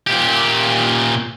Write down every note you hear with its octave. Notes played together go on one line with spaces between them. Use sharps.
A#2 G4